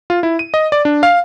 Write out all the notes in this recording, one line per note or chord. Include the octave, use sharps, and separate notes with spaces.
F4
E4
D#7
D#5
D5
D4
F5